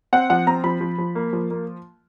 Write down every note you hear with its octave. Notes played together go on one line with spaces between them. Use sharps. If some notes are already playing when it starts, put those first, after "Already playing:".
C4 F#5
F3 F#5
C4 A#5
F3 B5
F3
F3
A#3
F3
A#3